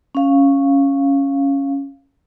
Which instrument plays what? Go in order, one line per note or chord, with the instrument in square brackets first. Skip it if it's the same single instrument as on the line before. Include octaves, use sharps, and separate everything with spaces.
[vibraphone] C#4 F5